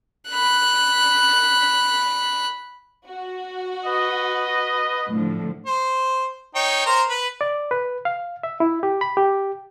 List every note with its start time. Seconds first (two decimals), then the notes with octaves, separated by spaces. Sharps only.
0.30 B5 F#6
3.07 F#4
3.85 B4 D#5
5.10 A2 D3 F3
5.66 C5
6.55 D#4 C#5 G5
6.86 A#4 C5 A#5
7.09 B4
7.41 D5
7.71 B4
8.05 F5
8.43 E5
8.60 E4
8.83 G4
9.01 B5
9.17 G4